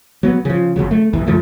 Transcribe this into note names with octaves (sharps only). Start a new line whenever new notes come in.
F#3 B3
C#3 F3
G1 C#2 C#3 F#3
A3
B1 E2 G2 E3
F#2 C#3 F3 A3